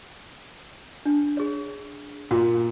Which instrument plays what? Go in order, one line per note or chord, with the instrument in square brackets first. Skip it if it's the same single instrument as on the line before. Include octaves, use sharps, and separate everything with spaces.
[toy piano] D4
G#4 C#5
[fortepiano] A#2 [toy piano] F#4